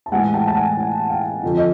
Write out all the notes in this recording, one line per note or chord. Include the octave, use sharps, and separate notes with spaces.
A5
A2 E3 G#3 F#5 G#5
G5 A5
A5
F#5 G#5
F#5 G#5
F5 G5
F2 D3 F3
D#5